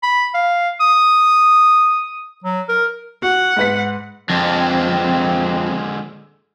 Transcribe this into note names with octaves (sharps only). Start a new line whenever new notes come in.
B5
F5
D#6
F#3
A#4
F#4 F#5
G#2 B4 B6
F2 D3 G#3 C4 F4